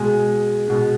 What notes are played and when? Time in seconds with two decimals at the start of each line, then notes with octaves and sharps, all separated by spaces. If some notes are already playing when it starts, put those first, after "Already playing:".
Already playing: B2 G#3 G#5
0.68 B2 G#3